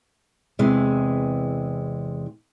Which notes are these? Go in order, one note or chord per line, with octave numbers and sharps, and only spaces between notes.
E2 C3 E3 G#3